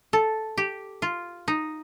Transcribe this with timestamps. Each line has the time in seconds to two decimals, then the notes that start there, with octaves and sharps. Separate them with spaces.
0.13 A4
0.58 G4
1.02 F4
1.48 D#4